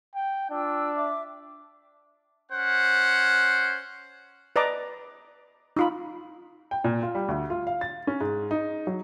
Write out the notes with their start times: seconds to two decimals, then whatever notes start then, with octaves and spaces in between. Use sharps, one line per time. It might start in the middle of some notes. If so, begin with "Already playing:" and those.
0.15 G5
0.50 D4 F4 G5 E6
0.94 E5 D6
2.52 C#4 C5 F#5
4.56 B4 D5 D#5 A5 A#5 D6
5.77 D#4 F4 B5
6.71 G5
6.84 A#2
7.03 F4
7.15 G3
7.28 D2
7.50 F4
7.67 F5
7.81 A6
8.07 C#4
8.21 G#2
8.51 D#4
8.87 F#3